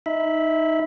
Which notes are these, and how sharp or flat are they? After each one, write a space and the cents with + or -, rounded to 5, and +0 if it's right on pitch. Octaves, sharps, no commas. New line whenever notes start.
D#4 +0 E5 -15 B5 +10